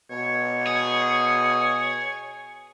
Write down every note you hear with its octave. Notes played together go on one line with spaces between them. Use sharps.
B2 C#5
G#4